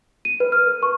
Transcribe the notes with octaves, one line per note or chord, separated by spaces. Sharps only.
D#7
B4
F6
A#4
C#6